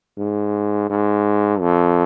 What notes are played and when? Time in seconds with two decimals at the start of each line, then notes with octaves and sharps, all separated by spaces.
0.18 G#2
0.90 G#2
1.60 F2